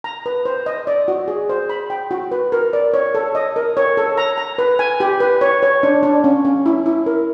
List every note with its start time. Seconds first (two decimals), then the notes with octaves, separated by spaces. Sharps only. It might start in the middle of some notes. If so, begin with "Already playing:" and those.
0.04 A#5
0.26 B4
0.45 C5
0.66 D#5
0.87 D5
1.08 F#4
1.28 G#4
1.49 C5
1.70 B5
1.90 G5
2.11 F#4
2.31 B4
2.52 A#4
2.73 D5
2.94 C#5
3.15 A4
3.35 D#5
3.56 A#4
3.77 C#5
3.97 A4
4.18 A#5
4.38 A#5
4.58 B4
4.79 G#5
5.00 G4
5.20 B4
5.41 C#5
5.63 C#5
5.83 D4
6.03 D4
6.24 C#4
6.45 C#4
6.66 E4
6.86 E4
7.06 A#4